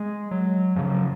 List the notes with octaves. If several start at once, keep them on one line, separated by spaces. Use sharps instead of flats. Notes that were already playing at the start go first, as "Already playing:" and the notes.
Already playing: G#3
F#3
F#2 C#3 F3
F#3